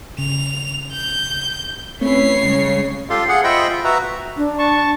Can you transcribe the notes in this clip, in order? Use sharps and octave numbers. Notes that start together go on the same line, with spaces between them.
C#3 F7
G6
A3 C4 C#4 E4 B4 C#5 C7
C#3 G3 G#3
F4 G4 A4 F5 C6
G#4 F#5
F4 C5 D#5 E5 G5 B5
F4
F#4 B4 E5 A#5
D4
A5 C#6